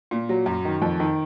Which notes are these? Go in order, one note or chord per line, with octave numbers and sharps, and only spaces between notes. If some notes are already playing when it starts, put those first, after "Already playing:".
A#2
F#3
F#2
D#3
F2
D#3